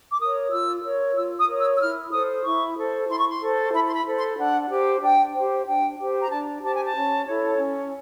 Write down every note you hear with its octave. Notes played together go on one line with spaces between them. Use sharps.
D6
A#4 C#5 D#6
F4 E6
A#4 C#5
F4 E6
D#6
A#4 C#5
E6
E6
E4 F6
A4 C5 D#6
E4 C#6
A4 C5
E4 C6
C#6
C6
A4 C5
E4 B5
C6
B5
A4 C5
C6
D4 F#5
G4 C5
D4 G5
G4 C5
D4 G5
G4 C5
A#5
D4 A5
G4 C5 A5
G#5
A5
C#4
E4 A4 C#5
C#4